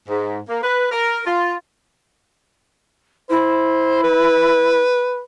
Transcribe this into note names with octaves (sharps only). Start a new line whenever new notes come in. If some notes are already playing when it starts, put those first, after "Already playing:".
G#2
A#3
B4
A#4
F4
E4 C5
B4